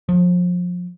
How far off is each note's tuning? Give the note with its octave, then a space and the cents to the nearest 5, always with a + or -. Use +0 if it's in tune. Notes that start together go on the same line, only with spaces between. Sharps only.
F3 +30